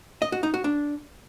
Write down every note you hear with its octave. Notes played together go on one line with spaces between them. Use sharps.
D#5
F#4
D#4
F#4
D4